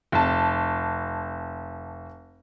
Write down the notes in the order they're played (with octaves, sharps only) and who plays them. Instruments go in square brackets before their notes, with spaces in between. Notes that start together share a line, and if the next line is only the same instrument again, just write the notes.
[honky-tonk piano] F1 A5